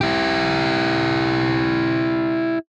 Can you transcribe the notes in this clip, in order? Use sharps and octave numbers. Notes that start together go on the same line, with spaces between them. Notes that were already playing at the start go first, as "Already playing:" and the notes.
E4 G4